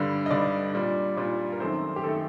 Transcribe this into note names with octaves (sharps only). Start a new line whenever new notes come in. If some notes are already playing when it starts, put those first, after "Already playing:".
Already playing: G2 D3 G3
D#5
G2 D3 G3 D5
A#2 G3 D4
A#2 G3 D4
A#4
F#2 D#3 A3 C4 C5
G4
D#3 A3 C4 A4